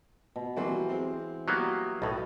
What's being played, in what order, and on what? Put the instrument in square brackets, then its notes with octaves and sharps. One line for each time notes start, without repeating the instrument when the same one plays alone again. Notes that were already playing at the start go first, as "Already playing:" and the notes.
[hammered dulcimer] B2
[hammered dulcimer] E3 C6 [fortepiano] F#3 G3 A#3
[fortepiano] G#3 C4
[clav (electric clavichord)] F#3 A#3 B3 [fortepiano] G3 [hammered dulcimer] F#4
[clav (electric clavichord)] B1 A2 [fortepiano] A4 B4 D#5